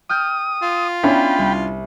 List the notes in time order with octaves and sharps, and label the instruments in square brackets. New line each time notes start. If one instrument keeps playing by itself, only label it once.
[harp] G5 F6 G6 [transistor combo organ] D#6
[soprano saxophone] F4
[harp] B3 [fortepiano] C#4 D4 E4 [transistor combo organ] G5 B5
[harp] C2